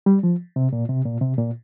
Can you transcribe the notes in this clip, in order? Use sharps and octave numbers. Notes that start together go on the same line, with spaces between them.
G3
F3
C3
A#2
C3
A#2
C3
A#2